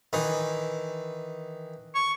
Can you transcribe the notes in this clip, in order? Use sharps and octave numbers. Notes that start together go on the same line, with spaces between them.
D#3 E3
C#6